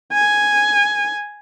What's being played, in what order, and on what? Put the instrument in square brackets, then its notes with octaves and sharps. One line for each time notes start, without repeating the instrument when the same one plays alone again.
[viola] G#5